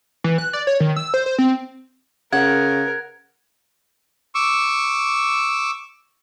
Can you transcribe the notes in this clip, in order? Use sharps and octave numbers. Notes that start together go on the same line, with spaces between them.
E3
F#6
D5
C#5
D#3
E6
C5
C5
C4
C#3 A#4 F#5 G#6
C#6 D6 E6